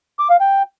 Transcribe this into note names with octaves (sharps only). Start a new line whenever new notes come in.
D6
F5
G5